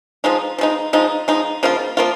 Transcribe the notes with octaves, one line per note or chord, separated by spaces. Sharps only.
F3 G#3 D#4
F3 G#3 D#4
F3 G#3 D#4
F3 G#3 D#4
C#3 F3 A#3 F4
F3 A#3 F4